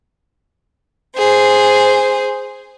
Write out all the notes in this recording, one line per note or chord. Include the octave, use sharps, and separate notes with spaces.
G#4 C5